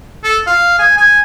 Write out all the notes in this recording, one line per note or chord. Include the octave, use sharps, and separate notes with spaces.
A4
F5
G#5
G#5